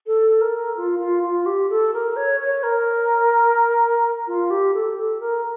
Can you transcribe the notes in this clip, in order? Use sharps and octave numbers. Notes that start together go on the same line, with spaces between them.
A4
A#4
F4
F4
F4
G4
A4
A#4
C#5
C#5
A#4
F4
G4
A4
A4
A#4